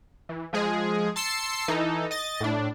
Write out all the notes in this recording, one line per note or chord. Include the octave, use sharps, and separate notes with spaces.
E3
F3 G#3 G#4
A5 C6 E6 C7 C#7
E3 D#4 A4
D#5 A6
A2 D4